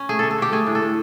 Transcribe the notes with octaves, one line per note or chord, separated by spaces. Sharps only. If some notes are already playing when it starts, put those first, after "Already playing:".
Already playing: C#4
A3 G#4
D3 A4
A4
D3 G4
A3 G#4
A2
A4
A2